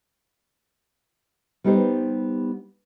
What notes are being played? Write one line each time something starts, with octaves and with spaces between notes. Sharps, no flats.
G3 B3 D#4 G4 C5